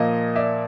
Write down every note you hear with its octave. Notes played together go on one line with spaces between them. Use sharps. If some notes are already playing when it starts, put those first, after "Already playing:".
Already playing: A#2 F3 A#3 D#5 F5
D5 E5